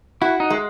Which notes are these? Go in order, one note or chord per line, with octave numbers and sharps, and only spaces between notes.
E4 F#4
D#4
G#3